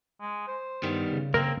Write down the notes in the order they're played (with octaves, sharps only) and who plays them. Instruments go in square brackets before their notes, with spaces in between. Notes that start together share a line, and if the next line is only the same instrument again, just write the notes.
[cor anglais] G#3
C5
[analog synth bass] G2 [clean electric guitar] D#3 G3 B3
[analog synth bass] C#3
[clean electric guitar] A#3 [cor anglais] C4 [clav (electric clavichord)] A#4